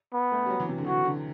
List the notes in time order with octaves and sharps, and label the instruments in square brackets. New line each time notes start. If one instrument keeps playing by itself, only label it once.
[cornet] B3
[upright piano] A3
G3
F#3
E3
C3
D3
[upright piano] E3 [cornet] F#4
[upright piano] D3